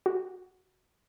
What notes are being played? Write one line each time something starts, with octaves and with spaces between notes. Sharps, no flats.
F#4